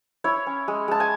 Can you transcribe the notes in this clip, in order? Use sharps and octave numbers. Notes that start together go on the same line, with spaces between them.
E4 C#5
C#4
G#3
G#3 A5
G#5